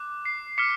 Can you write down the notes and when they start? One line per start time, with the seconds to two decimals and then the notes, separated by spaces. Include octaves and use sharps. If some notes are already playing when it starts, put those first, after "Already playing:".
Already playing: D6 F#6
0.25 C7
0.58 D6 F6 B6 C#7